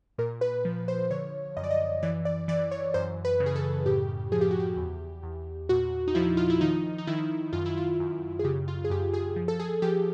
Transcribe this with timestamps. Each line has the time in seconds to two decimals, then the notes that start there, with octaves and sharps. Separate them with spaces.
0.18 A#2 A#4
0.41 B4
0.65 F3
0.88 C5
1.11 D3 C#5
1.57 F#2 D#5
1.64 D5
1.71 D#5
2.03 E3 D5
2.25 D5
2.48 E3 D5
2.71 C#5
2.94 F#2 C5
3.25 B4
3.40 C#3
3.46 G#4
3.56 A4
3.86 A2 G4
4.32 F3 G#4
4.41 G4
4.51 F#4
4.60 G4
4.77 E2
5.23 E2
5.69 A#2 F#4
6.08 D#4
6.15 F3 E4
6.37 F4
6.50 E4
6.61 D#3 D#4
6.98 D#4
7.07 D#3 E4
7.53 F#2 F4
7.66 E4
7.77 F4
7.99 F#2
8.39 G#4
8.44 C#3 G4
8.68 F4
8.84 G#4
8.90 F#2 G4
9.13 G#4
9.36 F3
9.48 A4
9.60 G#4
9.82 F3 G4